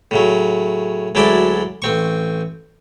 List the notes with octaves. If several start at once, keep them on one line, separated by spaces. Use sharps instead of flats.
A2 C#3 F#3
D2 F#3 G#3 E4 D5 A5
A1 C4 C#6